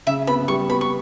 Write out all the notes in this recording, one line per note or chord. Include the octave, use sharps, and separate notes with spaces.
C#3 E5
B3 B5
G3 C#6
B3 B5
C#6